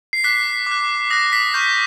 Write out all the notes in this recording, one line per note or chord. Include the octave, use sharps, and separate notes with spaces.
C7
D6 F#6 B6
D6 F#6
D#6 F#6 A#6
B6
C#6 F6 G6